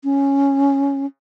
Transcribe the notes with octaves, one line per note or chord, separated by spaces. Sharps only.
C#4